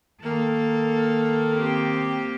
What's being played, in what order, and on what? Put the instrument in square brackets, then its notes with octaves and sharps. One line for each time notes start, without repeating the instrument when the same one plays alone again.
[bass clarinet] D#3 [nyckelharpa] A#3 [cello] A4
[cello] C4 G4